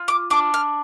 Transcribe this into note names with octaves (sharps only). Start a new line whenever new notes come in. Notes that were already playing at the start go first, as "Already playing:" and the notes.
Already playing: F4
D6
D4 D6
F6